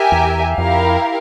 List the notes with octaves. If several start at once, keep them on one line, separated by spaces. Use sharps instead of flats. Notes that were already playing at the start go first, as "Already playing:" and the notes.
Already playing: G4 A#4 E5 G#5
E2
F2 E4 G4 A#4 F5